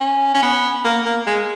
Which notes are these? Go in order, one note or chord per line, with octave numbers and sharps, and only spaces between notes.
C#4
C#4
B3
A#3
A#3
G#3